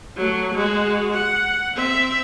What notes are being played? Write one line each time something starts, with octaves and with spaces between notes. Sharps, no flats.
F#3 A3
G#3 F#4
F#5
C4 E5